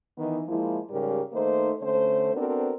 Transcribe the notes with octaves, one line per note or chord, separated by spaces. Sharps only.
D#3 E3 B3 D#4
F3 G#3 A#3 E4
G#2 C#3 G3 G4 A#4
D#3 A3 A#3 D#4 C5
D3 A3 C#4 C5
B3 C4 D4 F#4 A4 A#4